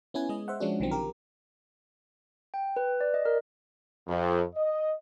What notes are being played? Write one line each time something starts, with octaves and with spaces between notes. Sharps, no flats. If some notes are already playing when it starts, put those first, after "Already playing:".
B3 C#4 E4 B4 G#5
G#3 D#5
C5 E5 F#5
F3 G#3 C#4 D4 F#4
B1 D3 D#3 F3 F#3 C4
G4 A#4
G5
B4
D5
D#5
A#4
F2
D#5